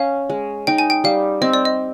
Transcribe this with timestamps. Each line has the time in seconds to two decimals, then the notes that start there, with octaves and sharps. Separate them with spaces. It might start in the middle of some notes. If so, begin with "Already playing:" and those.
Already playing: C#4 F5
0.30 G#3
0.67 D#4 G5
0.78 G#5
0.90 G5
1.04 G3 F5
1.42 C4 D#5
1.53 D5
1.65 D#5